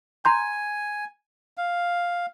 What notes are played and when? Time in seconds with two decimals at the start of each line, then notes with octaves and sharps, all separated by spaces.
0.25 G#5 A#5 C6 G6
1.58 F5